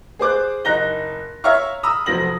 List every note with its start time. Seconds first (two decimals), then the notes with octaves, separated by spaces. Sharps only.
0.19 G#4 C5 D6 F#6
0.65 F#1 D#4 A#5 F#6 A#6 G7
1.44 C#5 E5 F5 A#5 C#6 F6
1.83 A#5 B5 D#6 E6
2.06 F1 F3 F#3 A#6 F#7